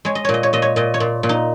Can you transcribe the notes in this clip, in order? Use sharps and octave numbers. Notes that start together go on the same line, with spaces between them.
G#3 C#5
D#5
A#2 C#5
D#5
C#5
A#2 D#5
C#5
A#2 D#5
C#5
A#2
A#2
D#4